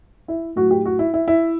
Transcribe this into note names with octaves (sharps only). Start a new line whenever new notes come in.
E4
A2 F#3 F#4
G4
F#4
E4
E4
E4